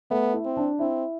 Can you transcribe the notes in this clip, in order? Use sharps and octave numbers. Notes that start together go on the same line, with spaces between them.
A3 B3
E4
C4
D4
C4 E4